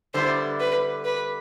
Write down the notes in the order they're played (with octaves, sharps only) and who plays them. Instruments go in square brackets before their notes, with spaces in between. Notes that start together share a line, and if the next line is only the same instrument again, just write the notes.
[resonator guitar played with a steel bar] D3 G3 B3 E4 [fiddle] C5
[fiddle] B4
B4